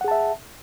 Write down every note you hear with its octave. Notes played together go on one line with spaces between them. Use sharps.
G#4 E5 F#5 A5